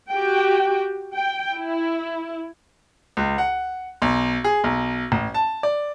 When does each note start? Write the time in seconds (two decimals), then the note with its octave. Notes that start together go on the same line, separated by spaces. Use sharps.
0.11 F#4 G4 G5
1.12 G5
1.54 E4
3.17 C#2
3.38 F#5
4.02 B1
4.44 G#4
4.64 B1
5.12 A1
5.34 A5
5.63 D5